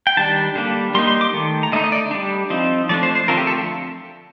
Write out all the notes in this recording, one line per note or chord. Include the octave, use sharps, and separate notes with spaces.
G5
D#3 G3 D4 A5
D3 G3 A#3 D4
G3 A#3 D#4 C6
C6
D6
D#3 A3
A#5
D3 A3 D#4 D#5
D#5
D5
G3 D4
F3 C4 D#4
F3 A3 D4 D5
C5
C5
D3 F3 A3 C4 A#4
G4
A4